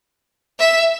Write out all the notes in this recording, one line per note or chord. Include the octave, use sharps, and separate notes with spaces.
E5